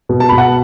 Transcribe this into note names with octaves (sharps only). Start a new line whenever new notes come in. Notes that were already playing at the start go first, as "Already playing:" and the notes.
B2
A5
B2 B5
F#5 A5